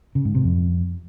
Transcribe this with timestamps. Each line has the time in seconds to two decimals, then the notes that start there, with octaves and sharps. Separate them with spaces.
0.15 C#3
0.25 G#2
0.35 C3
0.44 F2